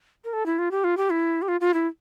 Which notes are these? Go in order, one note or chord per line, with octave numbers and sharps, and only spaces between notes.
A#4
A4
E4
F4
G4
F4
G4
E4
G4
F4
F4
E4